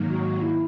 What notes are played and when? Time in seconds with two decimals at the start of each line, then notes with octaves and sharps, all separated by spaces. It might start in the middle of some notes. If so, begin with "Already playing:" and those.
Already playing: G#2 D#3 F#3 A#3
0.10 F#4
0.41 E4